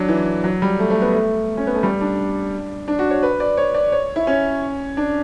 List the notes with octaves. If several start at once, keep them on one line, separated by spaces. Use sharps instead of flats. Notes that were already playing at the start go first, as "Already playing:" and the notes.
Already playing: F#3 D4
E3
F#3
G3
A3
A3
B3
A3
C#4
B3
A3
G3
D4
D4
F#4
C#5
B4
D5
C#5
D5
C#5
E4
C#4
D4